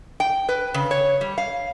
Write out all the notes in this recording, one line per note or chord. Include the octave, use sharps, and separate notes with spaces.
G5
B4
C#3
C#5
G3
F5